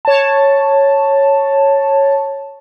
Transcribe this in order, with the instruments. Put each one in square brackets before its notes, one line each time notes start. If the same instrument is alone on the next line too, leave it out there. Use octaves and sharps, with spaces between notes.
[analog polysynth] C#5 A5